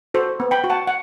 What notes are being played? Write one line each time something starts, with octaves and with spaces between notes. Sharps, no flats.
F#4 A4 C5
B3
G5 B5
F#4
F#5 A5
F#5